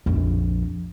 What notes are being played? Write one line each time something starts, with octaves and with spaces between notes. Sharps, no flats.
A#1 F2